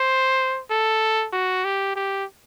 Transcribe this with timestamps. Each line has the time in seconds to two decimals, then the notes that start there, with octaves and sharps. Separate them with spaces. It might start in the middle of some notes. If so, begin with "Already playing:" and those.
Already playing: C5
0.70 A4
1.33 F#4
1.65 G4
1.96 G4